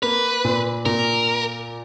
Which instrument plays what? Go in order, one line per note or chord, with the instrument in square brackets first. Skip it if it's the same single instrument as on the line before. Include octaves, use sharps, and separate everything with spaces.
[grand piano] A#3 [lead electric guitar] B4
[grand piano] A#2
[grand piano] A#2 [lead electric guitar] A#4